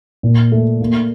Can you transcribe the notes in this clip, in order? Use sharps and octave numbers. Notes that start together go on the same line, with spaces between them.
A#2
A3
A#3